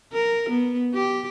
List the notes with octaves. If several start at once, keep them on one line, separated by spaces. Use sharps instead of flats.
A#4
B3
G4